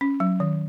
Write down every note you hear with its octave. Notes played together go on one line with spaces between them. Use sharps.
C#4
F#3
D#3